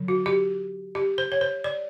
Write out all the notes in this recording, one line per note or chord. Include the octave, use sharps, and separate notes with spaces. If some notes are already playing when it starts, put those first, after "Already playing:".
Already playing: D3 F#3
F#4
G4
G4
C5
C#5
C5
D5